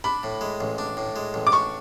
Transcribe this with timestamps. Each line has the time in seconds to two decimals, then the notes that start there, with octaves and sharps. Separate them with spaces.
0.04 D4 B5
0.23 A2
0.41 G#3
0.61 A1
0.78 D4
0.97 A2
1.16 G#3
1.34 A1
1.47 D6
1.52 D4 C#6